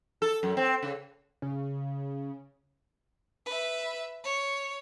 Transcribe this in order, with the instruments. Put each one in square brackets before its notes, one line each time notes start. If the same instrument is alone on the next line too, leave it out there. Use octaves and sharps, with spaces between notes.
[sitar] A4
F#2
C4
C#3
[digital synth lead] C#3
[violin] B4 E5
C#5